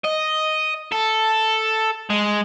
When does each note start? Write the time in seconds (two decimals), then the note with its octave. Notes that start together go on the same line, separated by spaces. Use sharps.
0.05 D#5
0.92 A4
2.10 G#3